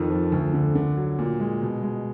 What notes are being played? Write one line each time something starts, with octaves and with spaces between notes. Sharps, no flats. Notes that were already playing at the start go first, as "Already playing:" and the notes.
Already playing: F2 D#3
F3
D2
D3
D3
F#3
A#2
G#3
B2
G#3